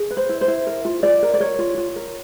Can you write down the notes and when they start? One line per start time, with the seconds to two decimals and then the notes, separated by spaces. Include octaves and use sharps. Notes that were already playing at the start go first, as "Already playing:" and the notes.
Already playing: G#4
0.11 B4
0.17 C5
0.29 E4
0.41 C5
0.48 E4
0.67 A#4
0.85 F4
1.03 F4 D5
1.23 A#4
1.34 D5
1.40 A#4 C#5
1.59 F4
1.78 F4
1.96 A#4